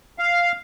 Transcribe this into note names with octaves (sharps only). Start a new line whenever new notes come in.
F5